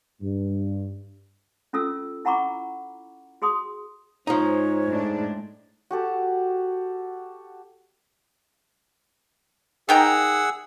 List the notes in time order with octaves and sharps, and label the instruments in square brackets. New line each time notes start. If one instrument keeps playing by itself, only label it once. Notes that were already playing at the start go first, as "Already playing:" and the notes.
[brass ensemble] G2
[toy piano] C#4 F4 A4 E6
E4 F#5 A#5 B5 C#6 D6
F#4 G#4 C6 D#6
[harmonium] G#2 [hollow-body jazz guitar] F3 D#4 [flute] C#5
[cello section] A2 G#3 D4
[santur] F#4 G4 A4
[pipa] D#3 G5 A#5 [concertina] G#4 F#5 E6